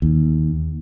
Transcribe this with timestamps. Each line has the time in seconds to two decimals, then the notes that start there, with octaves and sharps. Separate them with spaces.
0.02 D#2